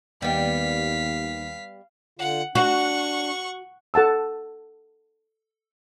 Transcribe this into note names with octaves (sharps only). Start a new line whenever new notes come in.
D#2 G3 B3 F5 B6
D3 F4 F#5
D4 F#4 F#5 C#6
A4 F#5 A5 E6